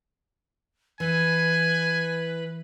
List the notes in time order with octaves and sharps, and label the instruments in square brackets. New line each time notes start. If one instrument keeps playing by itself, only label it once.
[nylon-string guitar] E3 [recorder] B4 [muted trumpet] G#5